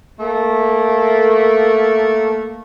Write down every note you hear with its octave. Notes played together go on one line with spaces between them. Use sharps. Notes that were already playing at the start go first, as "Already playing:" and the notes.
A3 A#3